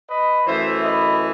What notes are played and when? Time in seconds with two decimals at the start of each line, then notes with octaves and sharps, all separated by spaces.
0.09 B4 D#5
0.46 F#2 E3 A3 C5 E5
0.83 B4 D#5